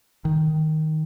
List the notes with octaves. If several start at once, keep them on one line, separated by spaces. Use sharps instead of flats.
D#3